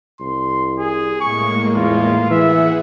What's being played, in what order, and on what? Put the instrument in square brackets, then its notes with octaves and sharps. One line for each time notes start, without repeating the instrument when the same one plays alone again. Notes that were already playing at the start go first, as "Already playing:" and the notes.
[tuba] C2 [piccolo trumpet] C6
[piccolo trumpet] G#4
[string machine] A2 G#3 A#3 [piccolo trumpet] C#6
[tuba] E2 [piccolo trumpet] F4
[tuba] E3 [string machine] G#4 F#5 [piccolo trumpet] E5